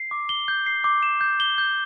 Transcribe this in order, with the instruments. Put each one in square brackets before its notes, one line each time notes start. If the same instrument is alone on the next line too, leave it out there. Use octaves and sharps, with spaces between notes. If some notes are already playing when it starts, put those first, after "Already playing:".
Already playing: [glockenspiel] C7
D6
G7
G6
C7
D6
E7
G6
G7
G6